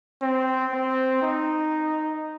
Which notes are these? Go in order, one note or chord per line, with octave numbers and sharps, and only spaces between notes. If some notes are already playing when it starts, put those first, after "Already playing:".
C4
C4
D#4